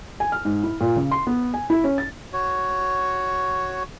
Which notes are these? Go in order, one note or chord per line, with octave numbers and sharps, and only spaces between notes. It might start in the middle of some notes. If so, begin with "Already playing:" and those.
G#5
F6
G#2
E4
A#2
C#3
C6
B3
G#5
E4
C#4
A6
F#4 C#5